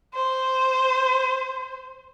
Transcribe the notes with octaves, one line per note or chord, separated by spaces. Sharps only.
C5